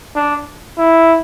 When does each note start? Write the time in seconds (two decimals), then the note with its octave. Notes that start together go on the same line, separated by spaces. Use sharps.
0.16 D4
0.78 E4